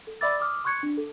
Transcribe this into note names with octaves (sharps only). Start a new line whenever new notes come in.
A4
D5 E5 B5 D6 E6 A6
D6 D#6 F6
C6 C#6 F#6 G#6 C#7
D4
A4